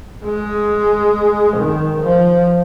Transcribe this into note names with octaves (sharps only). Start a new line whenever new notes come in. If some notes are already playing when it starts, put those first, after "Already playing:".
G#3
D#3
F3